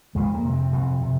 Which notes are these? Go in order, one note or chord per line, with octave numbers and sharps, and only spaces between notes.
F2 G#3
A#3
C3
C4
F2
C3